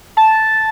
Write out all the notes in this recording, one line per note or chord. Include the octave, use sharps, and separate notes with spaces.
A5